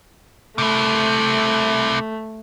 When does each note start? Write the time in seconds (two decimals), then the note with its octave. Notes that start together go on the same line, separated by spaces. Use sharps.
0.58 C3 A3 E4